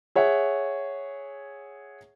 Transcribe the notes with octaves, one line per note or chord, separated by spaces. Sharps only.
G#4 C#5 E5 F#5